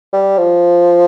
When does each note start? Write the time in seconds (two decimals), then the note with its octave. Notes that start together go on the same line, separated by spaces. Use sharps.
0.13 G3
0.38 F3